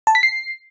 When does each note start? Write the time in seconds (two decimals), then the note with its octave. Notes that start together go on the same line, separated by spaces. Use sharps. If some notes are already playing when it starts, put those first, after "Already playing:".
0.07 A5
0.15 B6
0.23 C7